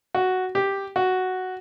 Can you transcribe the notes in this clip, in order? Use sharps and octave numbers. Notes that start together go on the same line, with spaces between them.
F#4
G4
F#4